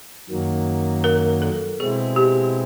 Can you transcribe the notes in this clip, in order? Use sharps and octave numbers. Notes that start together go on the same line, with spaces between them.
F#2 D#3 F#3 A#3
A#4
A4
B2 G#3 C4 E4 G#4
G4